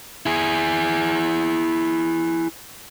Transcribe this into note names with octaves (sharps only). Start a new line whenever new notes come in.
E4 G#4